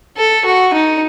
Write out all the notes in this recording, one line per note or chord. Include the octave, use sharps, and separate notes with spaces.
A4
F#4
D#4